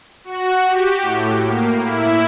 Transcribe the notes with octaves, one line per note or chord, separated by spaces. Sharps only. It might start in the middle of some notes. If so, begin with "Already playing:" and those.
F#4
G4
A2
A#3
E4